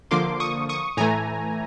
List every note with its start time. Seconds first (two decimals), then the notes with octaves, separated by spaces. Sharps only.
0.11 D3 F3 A#3 C6 D6
0.40 C#6 D#6
0.69 C#6 D#6
0.97 A2 E3 A3 G#5 A#5